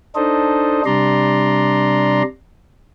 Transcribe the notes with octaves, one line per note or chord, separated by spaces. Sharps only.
D4 D#4 A4 C5 D#5
C3 G3 D4 D5 A#5 C6